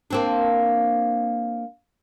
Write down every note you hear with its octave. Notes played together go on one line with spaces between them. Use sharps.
A#3 C4 D4